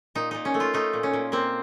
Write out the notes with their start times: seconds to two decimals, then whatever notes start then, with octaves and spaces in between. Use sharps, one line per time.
0.15 A#2 D#4
0.31 A#2 D#4
0.45 C#4
0.54 A3
0.60 F4
0.74 A3 D#4
0.93 A#2
1.03 C#4
1.13 A#2
1.32 A#3 C4